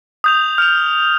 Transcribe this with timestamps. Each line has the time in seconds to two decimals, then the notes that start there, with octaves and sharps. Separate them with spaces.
0.24 D#6 G6 F7
0.58 F6 F7